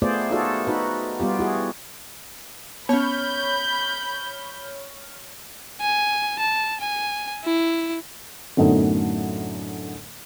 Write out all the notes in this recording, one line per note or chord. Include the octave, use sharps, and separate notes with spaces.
A3 B3 F4 G#4 C5 D5
D#4 F4 F#4 G#4 A4 D5
D#4 F#4 B4
G3 B3 F4 G4
E4 F#4 G#4
B3 C#4 C#5 B5 C#6 F6 G6
G#5
A5
G#5
E4
F#2 A2 D3 A3 B3 D#4